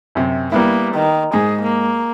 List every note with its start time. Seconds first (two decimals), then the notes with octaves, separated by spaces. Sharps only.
0.15 F#2 C3
0.52 G3 A#3 B3 E4
0.94 D#3
1.34 G#2 G#4
1.63 A#3